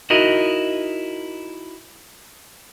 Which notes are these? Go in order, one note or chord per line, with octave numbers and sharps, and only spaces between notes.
D#4 E4 F#4 A#4 D#5